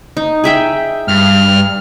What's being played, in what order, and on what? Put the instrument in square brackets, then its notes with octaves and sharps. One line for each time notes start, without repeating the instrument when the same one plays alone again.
[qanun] D#4
G#4 E5 G5
[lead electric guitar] G2 [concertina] F6